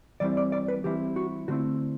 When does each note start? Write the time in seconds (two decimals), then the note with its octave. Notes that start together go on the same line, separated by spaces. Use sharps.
0.20 E3 G3 C4 E4 D5
0.37 D5
0.52 D5
0.68 B4
0.84 E3 G3 C4 E4 G4
1.16 F#4
1.48 D3 A3 C4 E4 F#4